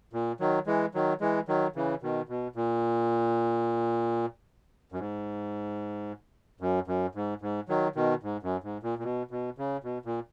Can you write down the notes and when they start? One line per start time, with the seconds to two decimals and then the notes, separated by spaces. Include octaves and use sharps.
0.13 A#2
0.40 D#3 F#3
0.67 E3 G#3
0.94 D#3 F#3
1.21 E3 G#3
1.48 D#3 F#3
1.76 C#3 E3
2.02 B2 D#3
2.29 B2
2.56 A#2
4.92 F#2
4.99 G#2
6.61 F#2
6.88 F#2
7.15 G#2
7.42 G#2
7.68 D#3 F#3
7.96 B2 D#3
8.23 G#2
8.43 F#2
8.64 G#2
8.83 A#2
8.99 A#2
9.04 B2
9.31 B2
9.58 C#3
9.84 B2
10.05 A#2